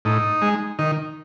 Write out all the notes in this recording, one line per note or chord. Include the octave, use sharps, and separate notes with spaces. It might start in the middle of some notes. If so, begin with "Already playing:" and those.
A2 D#4
G#3
D#3